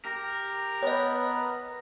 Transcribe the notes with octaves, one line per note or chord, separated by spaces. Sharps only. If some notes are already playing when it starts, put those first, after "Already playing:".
G4 A#4
B3 B4 C#5 D#5